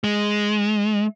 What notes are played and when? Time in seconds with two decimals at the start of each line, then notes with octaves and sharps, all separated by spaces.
0.04 G#3